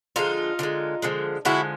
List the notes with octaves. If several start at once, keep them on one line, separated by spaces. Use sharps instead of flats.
D3 F3 G#3 D#4 F4
D3 F3 G#3
D3 F3 G#3
D3 F3 G#3 E4 F#4